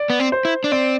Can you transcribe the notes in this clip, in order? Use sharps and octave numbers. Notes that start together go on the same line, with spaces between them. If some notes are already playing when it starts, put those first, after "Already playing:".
Already playing: D5
B3
C4
C5
E4
D4
C4 D5